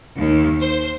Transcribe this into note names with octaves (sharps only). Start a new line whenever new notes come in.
D#2
C5